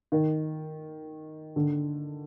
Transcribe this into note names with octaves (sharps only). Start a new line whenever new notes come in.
D#3
D3